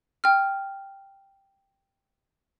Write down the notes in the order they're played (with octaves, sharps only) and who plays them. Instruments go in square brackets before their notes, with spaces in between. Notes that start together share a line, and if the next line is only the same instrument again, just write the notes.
[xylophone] G5 F6